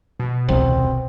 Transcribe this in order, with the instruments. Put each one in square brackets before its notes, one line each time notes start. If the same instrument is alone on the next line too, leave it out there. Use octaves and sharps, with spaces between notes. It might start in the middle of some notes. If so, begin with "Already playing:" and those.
[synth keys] B2
[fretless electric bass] D#1 C2 [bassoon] C4